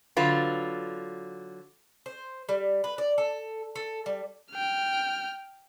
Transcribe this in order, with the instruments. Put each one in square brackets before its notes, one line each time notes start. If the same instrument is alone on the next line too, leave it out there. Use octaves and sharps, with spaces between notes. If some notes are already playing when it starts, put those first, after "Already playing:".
[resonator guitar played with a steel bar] D3 F#3 F4 B4
[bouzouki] C5
G3
B4
D5
A4
A4
G3
[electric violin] G5 F6